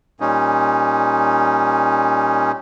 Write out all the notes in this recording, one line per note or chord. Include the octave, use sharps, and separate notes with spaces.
A#2 G3 C#4 D#4